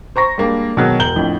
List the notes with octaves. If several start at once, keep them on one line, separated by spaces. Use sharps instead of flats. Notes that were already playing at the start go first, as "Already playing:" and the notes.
C5 A#5 C#6 A#6
G3 G#3 A#3 D4
B2 D#3 F#3 G#3 D#4
E1 A#5 G6 F#7 G7
F2 A2 D3